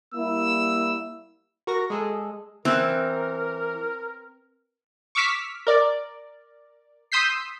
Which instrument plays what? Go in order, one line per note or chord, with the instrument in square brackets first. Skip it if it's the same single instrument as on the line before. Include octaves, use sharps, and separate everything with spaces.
[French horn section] G3 A#3 E4 [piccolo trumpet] E6
[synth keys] F#4 A#4 C#6 A#6
G#3 G#4 A4
[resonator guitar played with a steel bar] E3 [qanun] C4 [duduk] A#4
[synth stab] C#6 D6 E6 F6 B6
A#4 D5
C6 D#6 E6 G6 B6 C7